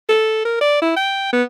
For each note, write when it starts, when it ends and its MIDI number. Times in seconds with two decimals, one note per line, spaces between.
0.09 0.42 69
0.45 0.59 70
0.61 0.78 74
0.82 0.91 64
0.96 1.29 79
1.33 1.43 59